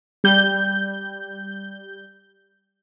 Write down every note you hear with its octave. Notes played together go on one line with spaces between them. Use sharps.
G3 G6